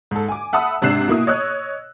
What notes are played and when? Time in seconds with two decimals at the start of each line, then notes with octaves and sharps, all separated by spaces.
0.11 G#2 A4
0.28 G#5 D6
0.53 E5 F#5 A5 B5 D#6 E6
0.82 G#2 C3 D4 F#6 C7 E7
1.08 B2 A#3 E4 D#6
1.27 C#5 D#5 D#6 E6 F#6